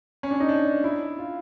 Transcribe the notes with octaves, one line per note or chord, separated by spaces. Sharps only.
C#4
D4
D#4
D4
E4
F4